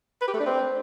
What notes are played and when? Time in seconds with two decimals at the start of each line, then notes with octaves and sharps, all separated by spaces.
0.21 B4
0.28 G4
0.34 A3
0.40 D4
0.46 C4